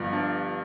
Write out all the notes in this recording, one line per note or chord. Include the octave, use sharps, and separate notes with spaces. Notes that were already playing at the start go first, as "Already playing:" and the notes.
Already playing: G1 G2 F3
D4